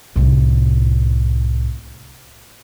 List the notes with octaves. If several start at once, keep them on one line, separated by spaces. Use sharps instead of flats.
C2 A2